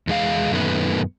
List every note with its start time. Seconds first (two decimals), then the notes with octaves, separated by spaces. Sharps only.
0.07 E2 G#3 F5
0.51 F#2 A#2 D#3 A3 B3 B4